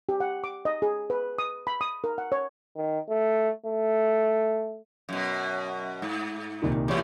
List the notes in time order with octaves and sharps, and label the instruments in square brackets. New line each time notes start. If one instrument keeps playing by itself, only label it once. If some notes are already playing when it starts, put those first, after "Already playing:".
[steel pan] G4
F#5
D6
D#5
G#4
B4
D#6
B5
D#6
A#4
F#5
C#5
[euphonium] D#3
A3
A3
[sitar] F#2 B2
G#2
[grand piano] C2 A#2 D#3
[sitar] A2 E3 [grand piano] G4 C#5